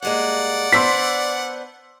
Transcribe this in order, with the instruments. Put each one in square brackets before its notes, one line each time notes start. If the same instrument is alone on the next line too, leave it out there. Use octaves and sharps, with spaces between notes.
[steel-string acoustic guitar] G2 G#3 A#3 [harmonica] D5 F#5
[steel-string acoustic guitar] B3 D4 C5 [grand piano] C6 E6 B6